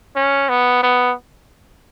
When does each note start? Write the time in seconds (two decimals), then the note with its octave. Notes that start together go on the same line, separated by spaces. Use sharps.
0.16 C#4
0.49 B3
0.83 B3